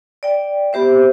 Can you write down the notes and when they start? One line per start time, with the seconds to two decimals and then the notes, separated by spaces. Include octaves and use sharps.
0.23 D5 G5
0.73 B3 G4 C5 E5